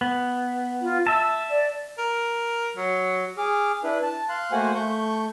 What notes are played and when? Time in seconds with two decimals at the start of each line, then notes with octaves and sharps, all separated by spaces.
0.01 B3
0.82 F4
1.07 E5 A5 E6
1.50 D5
1.98 A#4
2.77 F#3
3.37 G#4 D6 F6
3.84 D4 E4 B4
4.03 A5
4.29 F5 C6 F#6
4.52 A3 A#3 F#4 C5 F#5 G#5
4.75 A3 C#6 G6